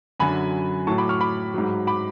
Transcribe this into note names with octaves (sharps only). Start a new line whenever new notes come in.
F#2 D3 F#3 G#5 B5
A2 F#3 A5 C#6
B5 D6
C#6 F6
B5 D6
G#2 F#3
B5 D6